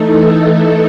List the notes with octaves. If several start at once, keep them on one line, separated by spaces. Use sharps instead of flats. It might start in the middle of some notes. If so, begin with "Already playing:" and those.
Already playing: E3 A3 D#4 A4